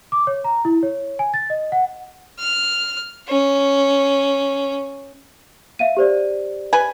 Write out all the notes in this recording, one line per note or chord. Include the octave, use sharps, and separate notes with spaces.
D6
C#5
A#5
E4
C#5
G#5
A6
D#5
F#5
F6
C#4
E5 F5 D#7
G4 C5 D5
B4 G#5